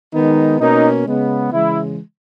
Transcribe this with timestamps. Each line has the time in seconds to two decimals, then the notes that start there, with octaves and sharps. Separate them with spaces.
0.14 D#3 G#3 B3 D#4
0.60 B2 A#3 C#4 D#4
1.06 C#3 G#3 B3
1.52 C#3 E3 G#3 E4